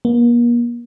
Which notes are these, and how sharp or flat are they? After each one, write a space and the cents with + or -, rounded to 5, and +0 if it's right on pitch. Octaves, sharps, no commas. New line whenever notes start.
A#3 +40